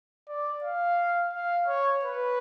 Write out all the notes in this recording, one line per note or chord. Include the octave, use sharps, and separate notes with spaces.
D5
F5
F5
C#5
B4